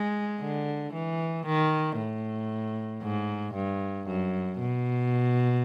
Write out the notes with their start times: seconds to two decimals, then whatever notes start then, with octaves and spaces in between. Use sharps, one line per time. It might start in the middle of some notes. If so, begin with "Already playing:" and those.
Already playing: G#3
0.41 D3
0.93 E3
1.46 D#3
1.98 A2
3.03 G#2
3.55 G2
4.07 F#2
4.60 B2